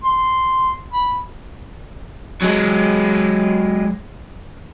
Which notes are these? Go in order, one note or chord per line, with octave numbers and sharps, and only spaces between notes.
C6
B5
F#3 G#3